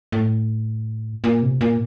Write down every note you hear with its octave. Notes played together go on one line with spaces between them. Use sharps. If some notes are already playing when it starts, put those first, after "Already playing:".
A2
A#2
C3
A#2